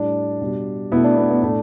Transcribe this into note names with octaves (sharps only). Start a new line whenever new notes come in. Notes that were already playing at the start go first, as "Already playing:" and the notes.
Already playing: A2 G3 D4
B2 G3
B2 A3 B3 E4
D4
B3
B3
A2 A3 D4